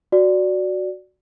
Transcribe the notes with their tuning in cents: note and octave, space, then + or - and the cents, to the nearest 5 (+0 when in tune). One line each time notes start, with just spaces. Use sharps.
F#4 +0 D5 +0